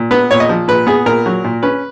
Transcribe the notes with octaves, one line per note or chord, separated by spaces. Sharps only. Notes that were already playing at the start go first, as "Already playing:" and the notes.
Already playing: A#2
B3 B4
A#2 C#5
D#5
F3
A#2 B4
B3 G#4
A#2 A#4
F#3
A#2
C#4 B4